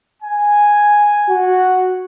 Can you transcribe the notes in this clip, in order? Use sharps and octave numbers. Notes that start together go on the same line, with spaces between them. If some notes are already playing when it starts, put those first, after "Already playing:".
G#5
F#4